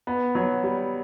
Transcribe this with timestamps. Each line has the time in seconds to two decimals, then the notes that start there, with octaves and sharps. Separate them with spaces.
0.07 B3
0.35 F#3
0.64 G3